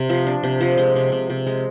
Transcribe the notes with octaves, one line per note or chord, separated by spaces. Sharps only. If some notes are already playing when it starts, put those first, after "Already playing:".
Already playing: C3
F3
D4
C3
F3
G#3
C3
C3
C3
G#3